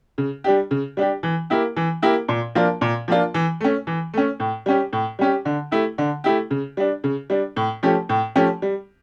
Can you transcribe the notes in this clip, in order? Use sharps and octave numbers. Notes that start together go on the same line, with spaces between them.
C#3
G3 D4 G4
C#3
G3 D4 G4
E3
A#3 E4 G4
E3
A#3 E4 G4
A#2
F3 A#3 D4 F4
A#2
F3 A#3 D4 F4
E3
A3 C#4
E3
A3 C#4
A2
G3 C#4 G4
A2
G3 C#4 G4
D3
A3 E4 G4
D3
A3 E4 G4
C#3
G3 D4
C#3
G3 D4
A2
F3 A3 C#4 G4
A2
F3 A3 C#4 G4
G3